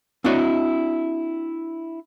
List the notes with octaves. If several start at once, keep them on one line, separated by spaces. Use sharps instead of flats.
C4 D4 E4 F#4 C#5 D#5